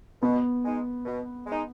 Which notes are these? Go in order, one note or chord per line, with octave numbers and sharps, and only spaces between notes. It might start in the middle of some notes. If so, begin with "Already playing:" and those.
B2 B3
G#3 D#4
B2
G#3 D#4